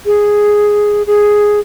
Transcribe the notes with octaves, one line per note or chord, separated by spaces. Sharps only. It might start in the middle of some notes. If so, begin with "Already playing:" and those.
G#4
G#4